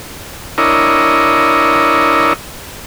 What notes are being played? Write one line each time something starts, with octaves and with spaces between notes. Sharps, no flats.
D4 E4 A#4 C#5 D#5